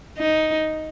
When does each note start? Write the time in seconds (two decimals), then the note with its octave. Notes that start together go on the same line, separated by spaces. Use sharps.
0.18 D#4